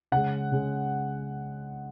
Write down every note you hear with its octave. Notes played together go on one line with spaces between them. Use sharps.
C#3 G#3 F#5
C#3 G#3